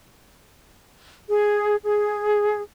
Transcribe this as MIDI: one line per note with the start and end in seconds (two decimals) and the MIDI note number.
1.29 1.77 68
1.84 2.61 68